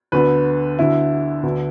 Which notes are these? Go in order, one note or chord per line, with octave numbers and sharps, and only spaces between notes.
D2 D3 B3 B4
D2 D3 B3 E4
D2 D3 B3